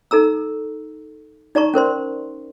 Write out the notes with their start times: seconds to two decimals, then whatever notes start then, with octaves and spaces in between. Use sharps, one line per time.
0.11 D#4 A4 A#5 E6
1.55 D#4 D5 A5 A#5 C#6
1.74 C#4 A#4 C5 C6